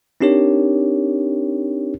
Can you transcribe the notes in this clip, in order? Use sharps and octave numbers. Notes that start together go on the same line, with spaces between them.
C4 D4 D#4 G4 A#4 C#5